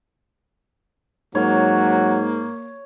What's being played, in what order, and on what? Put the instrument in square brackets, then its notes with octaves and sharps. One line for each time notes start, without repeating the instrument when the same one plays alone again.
[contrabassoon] G#2 [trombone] F#3 [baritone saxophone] A#3 [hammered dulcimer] C#5